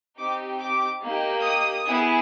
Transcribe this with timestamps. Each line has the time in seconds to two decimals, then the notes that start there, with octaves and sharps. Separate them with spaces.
0.18 C4 D#4 G4 D6
0.59 D6
1.01 A#3 D#4 G4
1.43 D#6
1.86 B3 E4 G#4